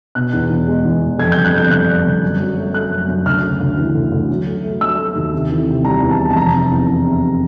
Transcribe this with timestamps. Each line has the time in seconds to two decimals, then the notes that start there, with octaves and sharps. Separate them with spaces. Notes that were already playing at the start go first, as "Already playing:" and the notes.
0.15 B2 F#6
0.33 E2
0.50 E2
0.68 G#3
0.85 E2
1.02 E2
1.19 F2 G#6
1.32 G6
1.36 G1
1.45 F#6
1.53 F2 G6
1.71 G1 F#6
1.88 F2
2.05 G1
2.22 F#2
2.40 F#3
2.57 A3
2.74 A3 F#6
2.91 F#2
3.08 F#2
3.26 D2 F6
3.43 C#3
3.60 D2
3.78 E3
3.95 D2
4.12 D2
4.29 F#3
4.47 A3
4.64 A3
4.81 F#3 E6
4.98 A3
5.15 D#2
5.33 C3
5.50 E3
5.67 C3
5.85 G3 A#5
6.02 E2
6.11 A5
6.19 C3
6.31 A5
6.36 F1 A#5
6.53 C3
6.71 E2
6.89 E2
7.06 C3